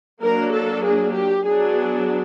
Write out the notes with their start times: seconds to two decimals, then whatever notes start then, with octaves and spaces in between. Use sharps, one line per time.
0.22 F#3 A#3 D4 A#4
0.54 A4
0.84 G#4
1.15 G4
1.46 F#3 B3 D4 G#4